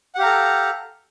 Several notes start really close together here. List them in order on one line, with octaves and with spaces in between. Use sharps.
F#5 G4 F5 A#5 A4